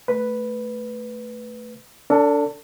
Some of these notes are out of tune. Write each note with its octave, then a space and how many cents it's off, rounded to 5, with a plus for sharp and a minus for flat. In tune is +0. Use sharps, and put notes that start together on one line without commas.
A3 +0 B4 +0
D4 -25 A4 +30